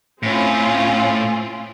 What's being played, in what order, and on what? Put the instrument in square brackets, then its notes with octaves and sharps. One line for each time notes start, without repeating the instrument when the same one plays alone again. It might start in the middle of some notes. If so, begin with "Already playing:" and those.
[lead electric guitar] A2 [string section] C4 C#4 F4